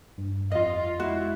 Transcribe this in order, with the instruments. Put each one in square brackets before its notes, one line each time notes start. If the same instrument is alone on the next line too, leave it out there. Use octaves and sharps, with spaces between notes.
[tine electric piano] G2
[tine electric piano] F2 [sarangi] F4 [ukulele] D#5
[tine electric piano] G#3 [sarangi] E4 [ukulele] F#4